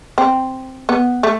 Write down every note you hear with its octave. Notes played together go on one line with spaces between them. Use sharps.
C4
B3
A3